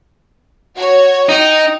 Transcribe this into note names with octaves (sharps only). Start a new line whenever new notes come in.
F#4 C#5 G#6
D#4 D#5 G5